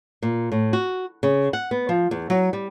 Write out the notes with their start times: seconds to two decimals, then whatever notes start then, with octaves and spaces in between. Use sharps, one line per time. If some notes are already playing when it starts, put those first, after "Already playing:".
0.22 A#2
0.52 A2
0.73 F#4
1.23 C#3
1.53 F#5
1.71 B3
1.89 F3
2.11 E2
2.30 F#3
2.53 G3